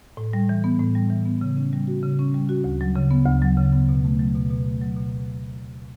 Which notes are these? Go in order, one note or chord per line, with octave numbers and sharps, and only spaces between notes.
A2
G3
E3
B3
A2
G3
E3
B3
C#3
C#4
G3
F#4
C#3
C#4
G3
F#4
D2
F#3
C#3
B3
D2
F#3
C#3
B3
B2
A3
F#3
B2
B2
A3
F#3
B2